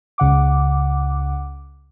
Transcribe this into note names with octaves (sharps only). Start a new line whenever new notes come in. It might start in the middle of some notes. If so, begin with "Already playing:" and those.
C#2 C#3 F#5 D6